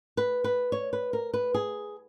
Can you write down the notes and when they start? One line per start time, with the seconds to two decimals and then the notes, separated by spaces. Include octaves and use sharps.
0.17 B4
0.44 B4
0.72 C#5
0.93 B4
1.13 A#4
1.34 B4
1.54 G#4